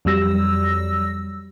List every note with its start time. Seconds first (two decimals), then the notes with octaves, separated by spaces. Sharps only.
0.05 F2 F#3 G3 E6 A#6